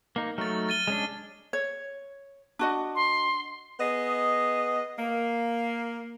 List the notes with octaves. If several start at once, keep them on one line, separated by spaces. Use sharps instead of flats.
A#3 D#4
F#3 A3 D#4 F6 A6
A6 D#7 G7
G#3 C#4 D4
C#5
D4 F#4 D#5
C6
B3 G#4 D#5
A#3